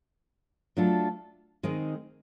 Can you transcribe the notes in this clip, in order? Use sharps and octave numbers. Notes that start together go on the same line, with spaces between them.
F#3 A3 D4 F4 A4
D#3 G#3 C4 D#4